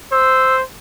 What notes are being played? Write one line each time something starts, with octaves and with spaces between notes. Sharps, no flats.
C5 E6